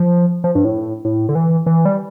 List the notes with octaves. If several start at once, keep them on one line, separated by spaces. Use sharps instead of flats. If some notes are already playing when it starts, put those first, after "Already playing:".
Already playing: F3
F3
G2
A2
A2
D3
E3
E3
G3